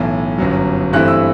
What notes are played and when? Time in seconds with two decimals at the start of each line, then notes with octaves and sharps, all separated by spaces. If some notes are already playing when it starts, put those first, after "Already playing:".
Already playing: B1 A2 E3
0.38 G1 F#2 F#3
0.93 G2 E3 A3 C4 E4 F#6
1.08 E6